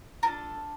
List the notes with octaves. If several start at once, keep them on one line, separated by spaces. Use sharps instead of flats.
D4 F4 A4 A#4